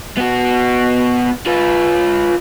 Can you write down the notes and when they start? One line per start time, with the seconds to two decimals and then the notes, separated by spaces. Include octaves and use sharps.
0.18 B3 F#4
1.46 F4 B4